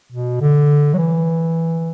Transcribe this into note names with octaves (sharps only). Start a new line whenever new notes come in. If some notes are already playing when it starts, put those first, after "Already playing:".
B2
D3
F#3
E3